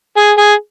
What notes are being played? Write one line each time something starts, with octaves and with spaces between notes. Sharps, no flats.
G#4
G#4